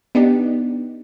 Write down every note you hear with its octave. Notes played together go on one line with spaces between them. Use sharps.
B3 D4 D#4 G4